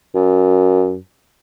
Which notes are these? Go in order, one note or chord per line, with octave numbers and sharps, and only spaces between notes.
F#2